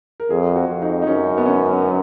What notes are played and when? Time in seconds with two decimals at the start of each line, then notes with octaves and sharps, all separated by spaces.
0.20 A#4
0.30 F2 G#4
0.56 F#4
0.69 F2
0.82 D#4
1.02 D#4
1.07 F#2 C#4
1.38 B3
1.46 C#4